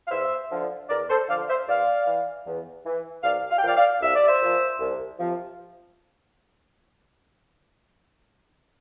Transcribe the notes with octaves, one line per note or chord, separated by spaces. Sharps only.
F5
E2 C5 E5
D3 F3
E2 A#4 D5
A4 C5
D3 F3 D5 F5
C5 E5
E2 D5 F5
E3
E2
E3
C2 D5 F5
F5
G5
A#2 F3 D5 F5
D5 F5
C2 E5
D5
C5 E5
A#2 F3
C2
C3 F3